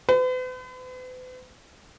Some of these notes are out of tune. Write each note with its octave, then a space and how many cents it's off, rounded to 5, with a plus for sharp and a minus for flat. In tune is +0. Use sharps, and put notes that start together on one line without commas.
B4 +45